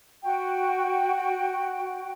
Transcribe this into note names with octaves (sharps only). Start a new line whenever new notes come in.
F#4 G5